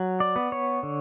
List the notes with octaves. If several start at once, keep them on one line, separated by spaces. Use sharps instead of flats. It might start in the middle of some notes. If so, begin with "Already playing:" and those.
Already playing: F#3
D5
B3
C#5
D3